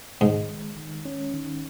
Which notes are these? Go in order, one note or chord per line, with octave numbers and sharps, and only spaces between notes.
G#2 D#3
G#3
D#3
C#4
D#3